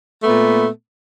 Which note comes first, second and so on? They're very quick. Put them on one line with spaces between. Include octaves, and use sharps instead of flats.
A3 B3 A#2